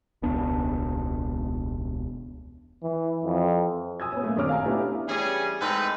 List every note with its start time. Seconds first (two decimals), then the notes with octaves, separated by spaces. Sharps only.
0.22 E1 C#2 B3 D4
2.83 E3
3.24 F2
4.00 G#5 D#6 E6 G#6
4.12 B3 C#4
4.23 A3 A#3
4.37 G#1 D4 C#5 D6 F6
4.49 F5 G#5 A#5
4.65 A3 B3 C#4 D4 E4 G4
5.08 E3 G3 C#4 G#4
5.62 G#2 A3 C4 D#4 B4